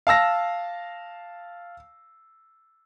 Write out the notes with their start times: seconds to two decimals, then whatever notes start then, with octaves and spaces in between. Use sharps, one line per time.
0.07 F5 A5 E6 A#6